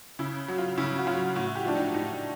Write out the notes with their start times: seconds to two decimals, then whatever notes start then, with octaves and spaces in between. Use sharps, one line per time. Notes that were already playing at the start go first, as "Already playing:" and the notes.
0.19 C#3 E4
0.48 F#3
0.58 F4
0.78 C#3 E4
0.98 F#4
1.07 F#3 F4
1.36 A2 F#4
1.55 G4
1.65 F3 D4
1.75 D#4
1.94 A2 D#4